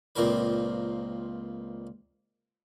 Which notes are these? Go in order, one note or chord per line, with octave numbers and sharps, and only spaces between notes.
C#2 A#2 C4 A#4 B4